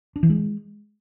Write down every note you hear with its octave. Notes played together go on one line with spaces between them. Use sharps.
D4
E3
G#3